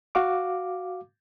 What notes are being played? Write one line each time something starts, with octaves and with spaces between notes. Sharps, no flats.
F#4 F5 D6